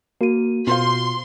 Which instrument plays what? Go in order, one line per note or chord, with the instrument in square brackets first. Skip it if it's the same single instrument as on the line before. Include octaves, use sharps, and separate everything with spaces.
[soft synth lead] A#3 [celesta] F#4 D#7
[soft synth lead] B2 [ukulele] F4 C5 F5 [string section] C6